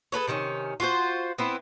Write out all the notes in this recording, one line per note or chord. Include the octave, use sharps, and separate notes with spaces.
G#4 A4 B4 C#5
C3 D#3 B3 C#4
F4 F#4 G#4 C5
B3 C4 E4